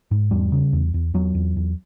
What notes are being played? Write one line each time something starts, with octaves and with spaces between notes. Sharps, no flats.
G#2
E2 G3
C#3
E2
E2
E2 F#3
E2
E2